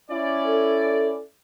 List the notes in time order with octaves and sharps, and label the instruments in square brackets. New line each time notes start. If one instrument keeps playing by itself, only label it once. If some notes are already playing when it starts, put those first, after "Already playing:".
[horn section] C#4 E4 D5
[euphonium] A4